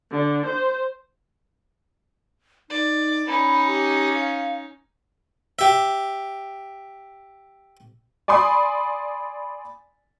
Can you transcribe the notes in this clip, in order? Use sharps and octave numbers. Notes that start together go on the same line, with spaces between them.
D3
C5
D#4 D5
C#4 D#4 B5
G4
F5
G4 E5
D5 G#5 B5 C6 D#6